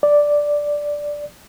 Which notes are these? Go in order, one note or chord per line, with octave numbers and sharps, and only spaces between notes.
D5